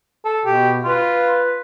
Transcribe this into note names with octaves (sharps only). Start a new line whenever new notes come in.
A4
B2 G4
F4 B4